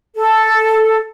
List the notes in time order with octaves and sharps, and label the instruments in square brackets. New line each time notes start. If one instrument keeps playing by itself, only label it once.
[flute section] A4